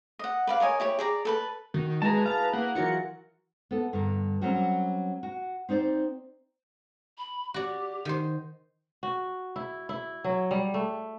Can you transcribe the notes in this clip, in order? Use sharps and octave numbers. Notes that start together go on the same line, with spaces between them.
D#5 F#5
B4 D5 F5
A#4 C#5 D#5 G#5
E4 G4 C#5
G#4 D5 A#5
A4 B4 A5
D#3 F#4
G#3 E4 G#4 B4 A5 A#5
F5 A5 A#5
A#3 F#5
E3 F#3 F4 A#4 C#7
B3 A4
G2 D3 A#4
F#3 G3 C4 C#4 F#4 G4
F#4
C4 D#4 C5 D5
B5
F#4 G4 D5
D#3 C5
F#4
E4
E4
F#3
G3
A3